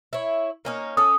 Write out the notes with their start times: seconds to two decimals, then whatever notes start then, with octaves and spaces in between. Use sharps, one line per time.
0.13 E4 C#5
0.65 A#3 C#4 D#4
0.97 C#4 A4 D#6